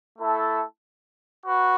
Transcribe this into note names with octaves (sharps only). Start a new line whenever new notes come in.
A3 E4 A4
F#4 B4